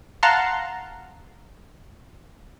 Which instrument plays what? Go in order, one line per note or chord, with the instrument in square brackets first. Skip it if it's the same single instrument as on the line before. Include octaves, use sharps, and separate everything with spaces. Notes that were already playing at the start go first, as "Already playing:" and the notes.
[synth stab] F5 F#5 A5 A#5 C6